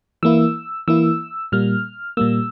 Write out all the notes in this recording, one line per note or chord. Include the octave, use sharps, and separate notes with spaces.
E3 A#3 E4 E6
E3 A#3 E4 E6
A#2 G3 A#3 F6
A#2 G3 A#3 E6